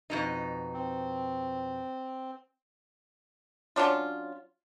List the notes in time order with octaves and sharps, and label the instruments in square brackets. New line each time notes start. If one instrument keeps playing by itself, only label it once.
[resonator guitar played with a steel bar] F2 B2 D#4
[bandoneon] C4
[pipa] F#3 C#4 D4 F4